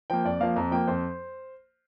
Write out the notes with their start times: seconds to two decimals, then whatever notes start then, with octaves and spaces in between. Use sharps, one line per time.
0.10 F3 A#3 G5
0.25 F2 D5
0.40 F3 A#3 F5
0.56 F2 A#5
0.71 F3 A#3 G5
0.88 F2 C5